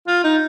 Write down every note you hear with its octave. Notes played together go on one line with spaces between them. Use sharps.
F4
D#4